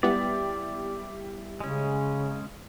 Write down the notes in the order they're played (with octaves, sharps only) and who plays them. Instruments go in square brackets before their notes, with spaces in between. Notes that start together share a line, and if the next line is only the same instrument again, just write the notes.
[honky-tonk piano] G3 E4 G4 [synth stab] B3 [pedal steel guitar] D5
[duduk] C#3 [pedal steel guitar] G#3 C#4